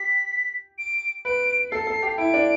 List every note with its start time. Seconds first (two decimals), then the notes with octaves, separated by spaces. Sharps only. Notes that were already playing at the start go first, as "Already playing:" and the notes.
Already playing: G4 B6
0.78 D7
1.25 B4 D7
1.71 A4 C7
1.87 A4
2.02 G4
2.18 E4 D7
2.34 D4